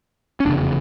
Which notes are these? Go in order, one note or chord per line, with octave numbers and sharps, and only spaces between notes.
C#4
F1 E2 C#3 D4